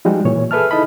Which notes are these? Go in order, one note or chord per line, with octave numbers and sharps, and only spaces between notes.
F3 G3 G#3 D#4 F#4
A#2 E3 C#5
G#4 A4 B4 E5 A5 F6
D#4 E4 A4 D#5 B5